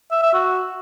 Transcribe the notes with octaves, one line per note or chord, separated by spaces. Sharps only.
E5
E5
F#4